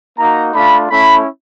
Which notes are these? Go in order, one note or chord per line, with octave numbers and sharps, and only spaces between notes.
A#3 D#4 F#4 A#5
A3 D4 F4 B5
A3 C#4 E4 B5